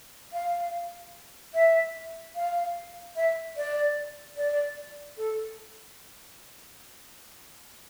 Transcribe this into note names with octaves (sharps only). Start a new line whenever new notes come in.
F5
E5
F5
E5
D5
D5
A4